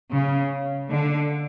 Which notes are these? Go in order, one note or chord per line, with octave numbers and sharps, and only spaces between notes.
C#3
D3